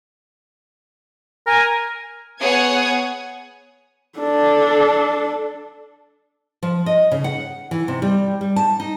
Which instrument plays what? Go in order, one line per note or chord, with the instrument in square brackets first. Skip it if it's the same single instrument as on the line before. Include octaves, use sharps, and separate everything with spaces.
[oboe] A#4 [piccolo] G#5
[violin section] B3 G#4 C#5 F#5 D#6 G#6
[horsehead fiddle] D4 A4
[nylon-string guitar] F3
D#5
C#3
F#5
E3
C3
G3
G3
A5
D#4